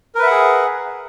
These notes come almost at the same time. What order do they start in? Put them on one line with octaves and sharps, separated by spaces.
A#4 B4 E5 F#5 G#4